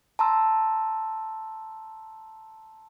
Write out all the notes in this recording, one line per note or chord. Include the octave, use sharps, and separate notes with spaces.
A5 A#5 C6 E6